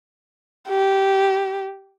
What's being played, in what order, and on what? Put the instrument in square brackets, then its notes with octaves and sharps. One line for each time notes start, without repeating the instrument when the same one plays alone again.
[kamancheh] G4